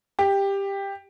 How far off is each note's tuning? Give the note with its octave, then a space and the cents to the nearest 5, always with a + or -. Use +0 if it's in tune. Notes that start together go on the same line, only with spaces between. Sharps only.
G4 +10